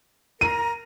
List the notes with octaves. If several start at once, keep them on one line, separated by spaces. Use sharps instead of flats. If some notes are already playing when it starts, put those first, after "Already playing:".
A#4 A#5 D#7